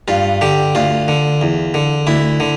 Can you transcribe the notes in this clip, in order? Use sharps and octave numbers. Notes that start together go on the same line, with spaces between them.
G2 F4
D3 G4
D2 F4
D3
E2
D3
D2 E4
D3